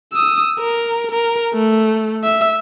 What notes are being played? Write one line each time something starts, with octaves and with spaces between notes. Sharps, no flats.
D#6 E6
A#4
A#4
A3
E5